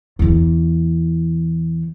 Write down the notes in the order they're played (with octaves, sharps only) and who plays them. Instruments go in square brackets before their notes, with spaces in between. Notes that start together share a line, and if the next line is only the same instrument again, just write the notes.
[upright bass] E2 E3